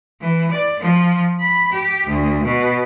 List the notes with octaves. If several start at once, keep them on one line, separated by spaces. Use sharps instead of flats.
E3
D5
F3
B5
G4
D2
B2